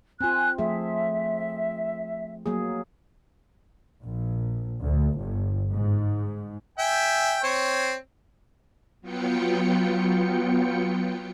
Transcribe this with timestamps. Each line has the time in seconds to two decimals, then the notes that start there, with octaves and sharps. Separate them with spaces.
0.21 C4 F4 G#5 F#6
0.58 F3 A3 G#4 E5
2.46 F#3 A#3 G#4
4.05 A#1
4.84 D2
5.18 G1
5.73 G#2
6.79 E5 G5 G#5
7.43 C4 C#5
9.02 F#3 B3 F4 G5 C#7